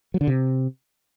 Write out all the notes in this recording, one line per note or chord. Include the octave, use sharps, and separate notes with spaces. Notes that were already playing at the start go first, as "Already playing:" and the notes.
F#3
D3
C3